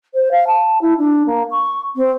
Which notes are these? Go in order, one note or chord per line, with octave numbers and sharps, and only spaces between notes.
C5
F5
A5
E4
D4
A#3
C#6
C4